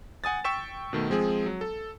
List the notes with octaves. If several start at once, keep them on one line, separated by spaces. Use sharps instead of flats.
F#5 G#5 D#6 A6
G5 C#6 E6 B6 E7
B2 D#3 A3
F3 G#3 C4 G#4
F#3
A4